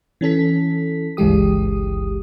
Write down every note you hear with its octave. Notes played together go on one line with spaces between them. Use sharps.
E3 C#4 A4 B6
G1 C#2 E3 G#3 G4 D#6